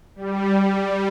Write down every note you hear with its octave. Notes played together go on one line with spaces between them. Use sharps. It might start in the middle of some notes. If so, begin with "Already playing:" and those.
G3
G3